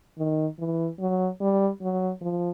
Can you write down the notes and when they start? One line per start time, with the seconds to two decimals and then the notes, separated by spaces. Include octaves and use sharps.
0.18 D#3
0.59 E3
0.99 F#3
1.41 G3
1.82 F#3
2.21 F3